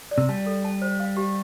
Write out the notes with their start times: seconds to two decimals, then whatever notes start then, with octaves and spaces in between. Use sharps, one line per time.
0.11 D5
0.18 C3
0.29 G3 A5
0.46 A4
0.65 A5
0.82 C5
1.00 F5
1.17 G4